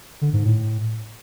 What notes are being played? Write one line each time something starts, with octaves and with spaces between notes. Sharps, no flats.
D3
G#2
A2